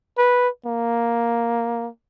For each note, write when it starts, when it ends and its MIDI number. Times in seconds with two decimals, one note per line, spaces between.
0.18 0.48 71
0.66 1.89 58